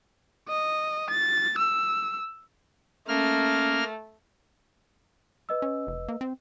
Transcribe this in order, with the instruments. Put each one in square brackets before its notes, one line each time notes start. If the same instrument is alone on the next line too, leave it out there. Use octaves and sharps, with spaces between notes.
[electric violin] D#5
A6
E6
[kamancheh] A3 [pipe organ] A#3 F6 [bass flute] C#4
[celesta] B4 D#5 E6
[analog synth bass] C#4
F1
A#3
C4